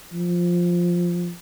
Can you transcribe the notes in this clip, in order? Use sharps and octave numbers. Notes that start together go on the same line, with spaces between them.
F3